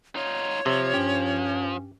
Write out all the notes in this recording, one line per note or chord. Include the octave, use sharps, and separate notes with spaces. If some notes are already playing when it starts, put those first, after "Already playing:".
D#4 F4 C#5
C3 F3
G2 C#4 G4